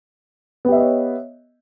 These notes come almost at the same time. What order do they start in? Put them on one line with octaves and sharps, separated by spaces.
B3 G4 E5 D#5 C#5